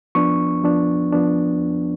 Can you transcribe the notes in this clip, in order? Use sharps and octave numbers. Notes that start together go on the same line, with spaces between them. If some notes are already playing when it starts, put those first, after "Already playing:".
F3 B3 D4 C#6
F3 B3 D4
F3 B3 D4